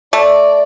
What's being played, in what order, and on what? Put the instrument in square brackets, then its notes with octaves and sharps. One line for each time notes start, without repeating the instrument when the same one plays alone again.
[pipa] A3 [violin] D5